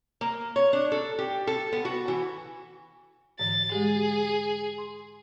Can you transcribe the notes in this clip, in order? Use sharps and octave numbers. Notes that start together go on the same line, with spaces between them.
A#3
C#5
D4
A4
G4
A4
B3
F#4
E3
G#2 D3 E3 A6
G#3 G4 G#4
C6